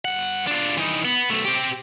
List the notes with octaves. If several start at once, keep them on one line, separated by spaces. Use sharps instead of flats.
G2 F#5
D4 F4
E3 D#4
B3
B1 A3
C4 G4